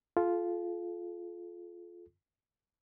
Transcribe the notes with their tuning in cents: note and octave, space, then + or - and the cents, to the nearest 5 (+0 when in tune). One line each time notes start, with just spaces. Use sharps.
F4 +0 A4 -35